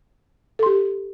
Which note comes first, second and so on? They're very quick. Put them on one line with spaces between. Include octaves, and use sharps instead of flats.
A4 C6 G4